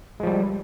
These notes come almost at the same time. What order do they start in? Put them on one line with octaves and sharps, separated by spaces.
G#3 F3 G3